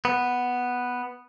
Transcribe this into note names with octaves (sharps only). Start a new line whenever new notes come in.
B3